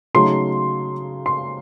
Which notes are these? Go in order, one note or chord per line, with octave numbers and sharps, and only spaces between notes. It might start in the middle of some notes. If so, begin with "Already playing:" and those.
C#3 F#3 A3 D#4 C6
C6